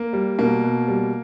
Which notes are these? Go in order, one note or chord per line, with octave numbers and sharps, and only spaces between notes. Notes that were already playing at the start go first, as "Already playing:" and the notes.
Already playing: A#3
G3
B2 A#3
B2
G3